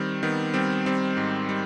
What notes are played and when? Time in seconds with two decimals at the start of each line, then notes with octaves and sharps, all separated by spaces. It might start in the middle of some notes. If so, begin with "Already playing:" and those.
Already playing: D#3 G3 C4
0.23 D#3 B3
0.54 G3 C4
0.86 G3 C4
1.17 G#2
1.49 G3